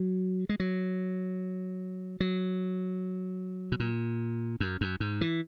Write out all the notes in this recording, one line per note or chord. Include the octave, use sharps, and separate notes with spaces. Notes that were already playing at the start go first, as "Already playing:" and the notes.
Already playing: F#3
G#3
F#3
F#3
B2
A#2
F#2
F#2
G#2
E3